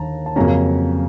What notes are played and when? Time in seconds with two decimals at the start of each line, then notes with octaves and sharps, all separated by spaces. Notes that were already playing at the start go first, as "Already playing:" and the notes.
Already playing: D#2 D3 A5 A#5
0.26 A5
0.36 F2 C#3 F#3 A#3 C#4 A#5